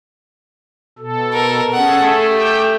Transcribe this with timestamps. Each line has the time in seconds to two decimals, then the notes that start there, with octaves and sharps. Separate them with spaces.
0.99 B2 A4
1.33 A#4
1.74 C#4 G#4 A4 F#5
2.02 A3
2.30 G4 G5